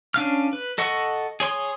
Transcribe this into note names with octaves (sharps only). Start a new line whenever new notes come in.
C#4 D4 F5 F6
B4
A4 D#5 F#5 C#6
G#4 C#5 C6 D#6